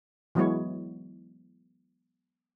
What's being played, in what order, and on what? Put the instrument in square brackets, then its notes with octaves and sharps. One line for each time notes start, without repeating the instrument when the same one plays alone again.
[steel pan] E3 F#3 G#3 B3 E4 C#5